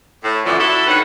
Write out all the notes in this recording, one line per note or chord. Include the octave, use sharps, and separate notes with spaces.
A2
F#2 A#2 D3 E3 F3
E4 F#4 A4
D3 D#3 A4 B4 C#5 F#5